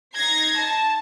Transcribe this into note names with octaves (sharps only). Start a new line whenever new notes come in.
D#4 G#6 A#6 C7
A5